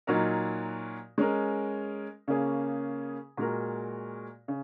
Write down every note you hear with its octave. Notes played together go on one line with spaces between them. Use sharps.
A#2 F#3 D#4 F#4 A#4
G#3 C#4 A#4
C#3 A#3 C#4 G#4
A#2 G#3 F#4 A#4
C#3